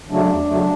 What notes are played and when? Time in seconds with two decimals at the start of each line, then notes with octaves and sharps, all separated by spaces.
0.10 C#3 F#3 A3 D4
0.29 E2
0.47 C#3 F#3 A3